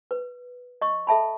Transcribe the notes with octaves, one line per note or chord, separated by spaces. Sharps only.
B4
D#5 C#6
A4 E5 A5 B5